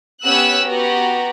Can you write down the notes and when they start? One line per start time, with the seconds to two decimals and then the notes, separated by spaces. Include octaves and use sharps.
0.24 B3 C#4 G4 E6 F#6
0.63 B3 F#4 G4 A#5